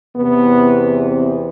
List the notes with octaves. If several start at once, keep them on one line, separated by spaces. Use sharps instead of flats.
E2 C3 E3 B3
C4